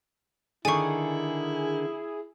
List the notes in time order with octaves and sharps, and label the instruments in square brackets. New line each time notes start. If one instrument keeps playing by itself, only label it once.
[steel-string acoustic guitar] D3 D#3 [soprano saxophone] E4 [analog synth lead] G#4 [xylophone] G#5 C#6